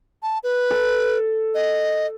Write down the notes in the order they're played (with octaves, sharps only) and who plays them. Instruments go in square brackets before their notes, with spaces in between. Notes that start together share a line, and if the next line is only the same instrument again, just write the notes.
[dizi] A5
B4
[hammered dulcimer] A4
[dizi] D#5